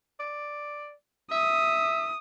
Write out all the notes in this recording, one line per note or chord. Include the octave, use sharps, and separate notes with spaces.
D5
E5 D#6